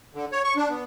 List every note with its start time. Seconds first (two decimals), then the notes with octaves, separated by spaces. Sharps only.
0.15 D3
0.32 C#5
0.44 C#6
0.56 D4
0.70 B3